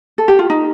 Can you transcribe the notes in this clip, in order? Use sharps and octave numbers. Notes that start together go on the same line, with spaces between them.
A4
G4
F4
D#4